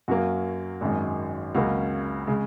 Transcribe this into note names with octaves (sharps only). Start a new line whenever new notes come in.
F#2 F#3 A#3 F#4
G#1 F#2 D#3 G#3
C#2 C#3 F#3 A#3 F#4
C#3 G#3